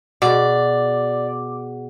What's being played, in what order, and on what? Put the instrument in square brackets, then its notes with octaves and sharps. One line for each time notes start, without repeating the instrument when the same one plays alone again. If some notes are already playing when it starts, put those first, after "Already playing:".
[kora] B2 [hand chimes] G#4 F#5 [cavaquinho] D5 [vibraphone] D6